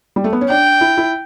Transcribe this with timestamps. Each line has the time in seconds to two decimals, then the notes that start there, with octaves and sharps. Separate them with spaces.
0.16 G3
0.24 A3
0.33 B3
0.41 C#4
0.49 D4 G5
0.81 E4
0.98 E4